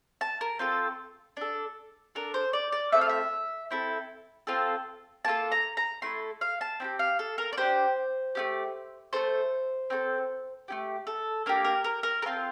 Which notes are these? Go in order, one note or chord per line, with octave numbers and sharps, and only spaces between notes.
A5
A#4
C4 F4 A4
D4 A4
D4 A4 A#4
C5
D5
D5
A3 C4 F4 A4 E5
F5
E5
C4 E4 A4
C4 F4 A4
A#3 F4 A4 A5
A#5
A#5
A3 E4 A4 C6
F5
A5
C4 E4 G4
F5
A4
A#4
D5
D4 G4 C5
A3 E4 G4
A3 D4 A4 C5
C4 F4 A4
A3 E4 G4
A4
A#3 D4 G4 A#4
A#4
A#4
A#4
C4 F4 A4 A#4